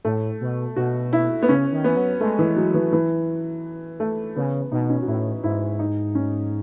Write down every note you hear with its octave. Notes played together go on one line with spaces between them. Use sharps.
A2 A3
B2
B2 F#4
E4
B3
C#3 C#4
D#3
E3 B3
F#3
G#3 A3
E3
F#3
E3
E3
A3
C#3 B3
B2 D#4
C#4
F#4
A2 E4
G#2 E4
D#4
C#4